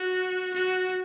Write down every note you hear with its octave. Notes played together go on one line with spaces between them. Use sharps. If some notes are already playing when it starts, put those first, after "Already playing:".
Already playing: F#4
F#4